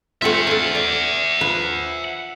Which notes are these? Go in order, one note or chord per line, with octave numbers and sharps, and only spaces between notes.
A3 C4 F4 E5 F#5
F4 A4
D5
F3 B4